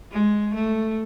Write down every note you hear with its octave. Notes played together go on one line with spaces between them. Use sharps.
G#3
A3